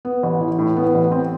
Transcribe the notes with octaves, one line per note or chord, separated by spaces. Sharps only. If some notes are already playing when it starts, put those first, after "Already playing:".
B3
A1
E3
A2
B3
A1
C4